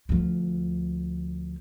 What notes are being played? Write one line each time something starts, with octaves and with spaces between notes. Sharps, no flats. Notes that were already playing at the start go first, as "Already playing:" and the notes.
D2 F3